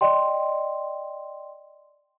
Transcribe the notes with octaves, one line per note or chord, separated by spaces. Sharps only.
D5 D#5 G5 C6